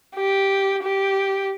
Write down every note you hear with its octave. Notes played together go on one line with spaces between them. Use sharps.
G4
G4